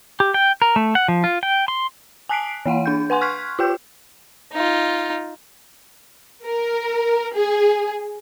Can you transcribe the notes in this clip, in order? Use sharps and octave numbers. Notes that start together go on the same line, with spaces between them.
G4
G5
A#4
A3
F#5
F3
F4
G5
C6
G#5 A5 F#6 B6 C7 D7
E3 A#3 F5 F#5
D4 G6
B4 F#5 G#5 C6
C6 C#6 F6 F#6 G#6 B6
F4 G4 G5 G6
D#4 F4
A#4
G#4